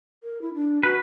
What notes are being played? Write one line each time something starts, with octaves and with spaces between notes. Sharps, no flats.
A#4
E4
D4
F#4 B4